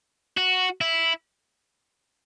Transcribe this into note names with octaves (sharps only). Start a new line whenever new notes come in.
F#4
E4